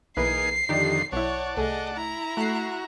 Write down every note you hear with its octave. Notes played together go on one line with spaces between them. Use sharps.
B1 E3 A#3 D#4 G#4 B4 C7
F2 D3 D#3 D#4 G4 D5
B1 E4 C#5 D5 F#5 A5
C2 A3 G#4 D#5
E4 A#5
A3 F#4 F#6 C7